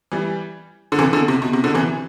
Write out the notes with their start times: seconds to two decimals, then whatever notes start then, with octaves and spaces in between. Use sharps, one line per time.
0.12 E3 G3
0.92 D3
0.99 C3 E3
1.13 B2 D3
1.28 C3
1.42 B2
1.53 C3
1.64 B2 D3
1.75 C3 E3